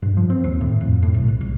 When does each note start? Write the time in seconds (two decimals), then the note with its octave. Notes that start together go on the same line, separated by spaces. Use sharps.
0.02 G2
0.17 F3
0.30 C4
0.44 D#2
0.61 A2
0.81 F2
1.02 A2
1.14 B1
1.28 C2
1.41 C2